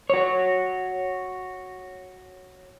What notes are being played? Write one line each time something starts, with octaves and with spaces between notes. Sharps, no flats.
F#4 C#5